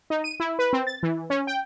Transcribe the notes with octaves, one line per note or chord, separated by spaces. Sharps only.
D#4
D#7
E4
B4
C4
A6
E3
C#4
G5